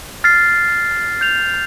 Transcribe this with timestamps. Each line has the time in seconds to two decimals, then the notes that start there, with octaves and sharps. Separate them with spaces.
0.24 F6 A6 C7
1.21 G6 F7